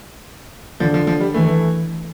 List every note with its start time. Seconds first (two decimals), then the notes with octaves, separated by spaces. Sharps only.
0.80 D3 F3
0.94 F3
1.07 F3
1.21 G3
1.34 E3 A3